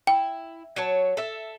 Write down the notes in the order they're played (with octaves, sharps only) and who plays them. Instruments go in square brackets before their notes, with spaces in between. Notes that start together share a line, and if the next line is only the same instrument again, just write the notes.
[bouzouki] E4 [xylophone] G5
[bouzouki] F#3 C#5 A5
A4 E5